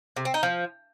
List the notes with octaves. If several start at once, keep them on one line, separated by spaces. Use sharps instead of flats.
C3
C4
D#4
F3